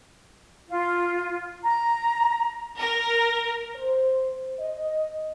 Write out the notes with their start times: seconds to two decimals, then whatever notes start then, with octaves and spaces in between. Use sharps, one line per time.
0.69 F4
1.63 A#5
2.79 A#4
3.76 C5
4.60 D#5